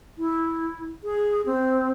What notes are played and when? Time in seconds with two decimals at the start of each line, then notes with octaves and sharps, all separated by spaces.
0.18 E4
1.04 G#4
1.46 C4